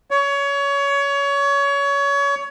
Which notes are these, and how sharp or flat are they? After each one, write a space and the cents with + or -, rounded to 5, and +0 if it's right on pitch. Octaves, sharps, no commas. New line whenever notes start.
C#5 +25